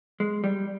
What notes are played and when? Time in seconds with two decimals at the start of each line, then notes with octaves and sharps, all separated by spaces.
0.20 G#3
0.44 G3